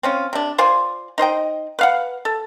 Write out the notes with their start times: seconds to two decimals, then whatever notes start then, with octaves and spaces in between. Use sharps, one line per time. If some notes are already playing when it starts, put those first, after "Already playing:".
0.03 C4 C#4 F4
0.33 C3 D4
0.58 F4 C5 D5 G#5
1.18 D#4 C5 D#5 G5
1.79 B4 F5 F#5
2.25 A4